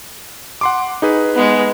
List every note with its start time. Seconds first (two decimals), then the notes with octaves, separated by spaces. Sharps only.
0.61 F#5 C6 D6
1.02 D#4 G#4 B4
1.34 G#3 B3